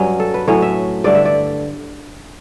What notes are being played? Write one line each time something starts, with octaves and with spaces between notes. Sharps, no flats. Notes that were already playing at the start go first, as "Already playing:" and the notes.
Already playing: G2 F#3 C#4
A4
B4
A2 F#3 A3 C#4 C#5
E5
G2 D3 A3 D5
E5
D5